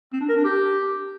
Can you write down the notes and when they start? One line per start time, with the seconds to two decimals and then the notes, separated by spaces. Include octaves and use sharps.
0.13 C4
0.21 D4
0.29 A#4
0.37 D4
0.44 G4